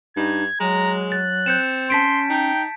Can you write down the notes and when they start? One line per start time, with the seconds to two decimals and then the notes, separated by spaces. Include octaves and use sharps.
0.16 G2 D#4 G#6
0.60 F#3 G#3 A#5
1.12 F#6 A6
1.46 C4 G6 C#7 E7
1.90 C#4 A5 C6 B6 D7
2.30 D#4 G5